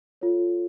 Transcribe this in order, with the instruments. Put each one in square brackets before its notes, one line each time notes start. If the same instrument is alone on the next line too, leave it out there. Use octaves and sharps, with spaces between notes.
[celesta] F4 A4 C#5